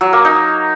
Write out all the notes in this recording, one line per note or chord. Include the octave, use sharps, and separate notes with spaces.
F#3
A#3
D#4